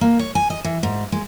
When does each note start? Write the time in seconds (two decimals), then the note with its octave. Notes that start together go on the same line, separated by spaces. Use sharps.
0.01 A#3
0.19 C#5
0.35 G#5
0.50 D#5
0.65 E3
0.83 G#2
1.12 G#3